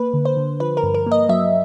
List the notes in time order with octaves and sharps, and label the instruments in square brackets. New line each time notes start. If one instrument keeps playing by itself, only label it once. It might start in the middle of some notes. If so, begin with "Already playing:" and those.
Already playing: [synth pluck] A#3 B4
D3
C5
D3
F3 B4
A#4
G2
A#4
A#3
D#5
F#3 E5